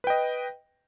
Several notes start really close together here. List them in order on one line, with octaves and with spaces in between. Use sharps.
B4 G5 D#5